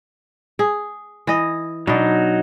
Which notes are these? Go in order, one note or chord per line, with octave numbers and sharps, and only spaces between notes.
G#4
E3 D#5
B2 F#3 D4 D#4